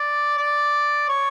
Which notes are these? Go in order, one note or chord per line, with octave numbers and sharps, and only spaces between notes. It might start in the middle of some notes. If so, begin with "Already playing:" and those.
Already playing: D5
D5
C#5